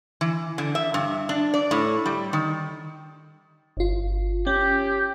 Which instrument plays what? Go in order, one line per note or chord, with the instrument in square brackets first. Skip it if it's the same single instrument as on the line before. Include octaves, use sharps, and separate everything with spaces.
[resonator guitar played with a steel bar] E3
D3
E5
G2
D4
D5
A2
G3
D#3
[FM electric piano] G1 F4
[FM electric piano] C#4 [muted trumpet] G4